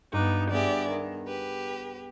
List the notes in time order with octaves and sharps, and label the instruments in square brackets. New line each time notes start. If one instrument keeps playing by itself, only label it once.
[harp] G2 D6 F#6 [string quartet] B3 D#4
[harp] B3 G#4 [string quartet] G4 D5 E5
[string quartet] D#3
G4 B4